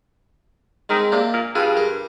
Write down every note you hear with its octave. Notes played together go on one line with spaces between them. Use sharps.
D#3 G#3 C4
C3 A#3 D4
A#2
G2 F4 G#4
G4 A#4